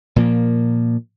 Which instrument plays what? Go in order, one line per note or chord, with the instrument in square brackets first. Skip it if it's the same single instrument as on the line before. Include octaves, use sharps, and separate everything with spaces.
[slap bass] A#2 F3 A#3